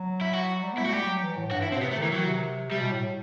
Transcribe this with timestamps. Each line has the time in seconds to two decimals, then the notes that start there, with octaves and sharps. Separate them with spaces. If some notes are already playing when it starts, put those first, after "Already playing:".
Already playing: F#3
0.21 E4
0.33 F#4
0.63 G3
0.73 B3 E4
0.83 A3 F#4
0.92 G3 G4
1.07 F#3
1.23 E3
1.37 A2
1.51 G2 F#4
1.63 E4
1.66 A2
1.72 C4
1.76 B2
1.81 C3 B3
1.91 A3
1.97 D#3 E3
2.12 D#3 F#3
2.27 C3
2.71 C3 G3
2.81 B2
2.91 A2